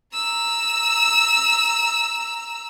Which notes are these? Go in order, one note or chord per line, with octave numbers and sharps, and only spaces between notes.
A#5 E6